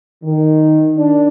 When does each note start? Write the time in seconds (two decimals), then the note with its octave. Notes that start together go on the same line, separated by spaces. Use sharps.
0.24 D#3
0.98 D4